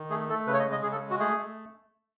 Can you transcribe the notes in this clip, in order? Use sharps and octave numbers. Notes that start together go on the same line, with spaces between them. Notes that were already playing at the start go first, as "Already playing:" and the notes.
Already playing: D#3
A3 G#4
A3 A4
C#3 B4
C#5
D#5
G#3
D#5
C#3 G#4
A4
G#3
F#4
A3 G#4
A3